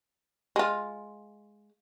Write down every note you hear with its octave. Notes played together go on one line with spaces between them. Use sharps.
G#3 F4